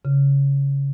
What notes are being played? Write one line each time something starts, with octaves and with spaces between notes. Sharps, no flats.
C#3